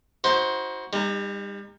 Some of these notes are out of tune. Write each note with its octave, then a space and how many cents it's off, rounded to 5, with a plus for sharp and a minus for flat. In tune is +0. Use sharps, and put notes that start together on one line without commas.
D#4 +45 F#4 +0 C5 +10
G3 +35 D#4 -20